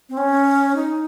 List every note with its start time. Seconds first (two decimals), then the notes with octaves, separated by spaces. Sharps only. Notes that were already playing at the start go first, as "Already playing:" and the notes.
0.09 C4
0.17 C#4
0.75 D#4